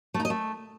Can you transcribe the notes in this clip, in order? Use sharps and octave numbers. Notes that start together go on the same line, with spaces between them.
A3
D#4
D#5
A3